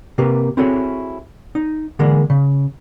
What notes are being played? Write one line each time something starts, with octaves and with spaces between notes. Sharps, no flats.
C3 A#3 G4 B4
C4 E4 F#4 G#4 A4 C#5
D#4
D3 E3 G#3 A#3
C#3